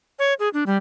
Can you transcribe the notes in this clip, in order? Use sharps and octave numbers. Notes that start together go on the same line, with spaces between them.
C#5
G#4
D4
G3